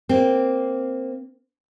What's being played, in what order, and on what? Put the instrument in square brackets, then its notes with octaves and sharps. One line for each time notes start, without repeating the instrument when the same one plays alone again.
[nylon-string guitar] A#3 C4